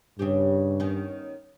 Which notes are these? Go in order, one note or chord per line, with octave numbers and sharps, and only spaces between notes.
G2 C#3 C#4 G4
D#3 B3 C#4